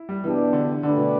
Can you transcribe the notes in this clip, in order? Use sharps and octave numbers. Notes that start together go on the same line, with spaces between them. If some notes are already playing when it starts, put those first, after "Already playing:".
Already playing: E4
G3
B2 E3 B3 D4 G4 D5
D3
D3 A3 D4 G4 B4 D5
B2